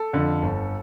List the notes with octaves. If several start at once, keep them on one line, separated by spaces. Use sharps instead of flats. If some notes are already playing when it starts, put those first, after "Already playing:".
Already playing: A4
F2 D3
G1